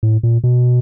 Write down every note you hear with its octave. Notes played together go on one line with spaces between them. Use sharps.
A2
A#2
B2